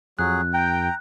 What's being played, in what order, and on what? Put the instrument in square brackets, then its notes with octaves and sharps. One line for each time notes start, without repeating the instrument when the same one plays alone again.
[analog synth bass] F2 [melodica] F#3 G#4 [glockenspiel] F#6
[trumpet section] G5 [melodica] A#5